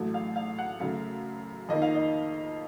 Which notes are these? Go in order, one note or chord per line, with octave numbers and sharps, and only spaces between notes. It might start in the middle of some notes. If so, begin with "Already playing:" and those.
Already playing: A1 A2 F#3 A3
F5
F5
F#5
F#2 C#3 A3 F5
F2 D#3 A#3 D#5
F5
D#5